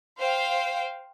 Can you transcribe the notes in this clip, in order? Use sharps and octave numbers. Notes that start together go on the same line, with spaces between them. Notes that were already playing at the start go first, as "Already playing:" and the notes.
C5 F5 G5